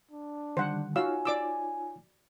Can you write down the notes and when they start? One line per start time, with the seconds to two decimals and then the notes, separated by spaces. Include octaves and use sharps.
0.11 D4
0.57 D3 D#3 G3 C5 F#5
0.96 D#4 F4 F#4 C#5 F5 G#5 E6
1.25 D5 D6 E6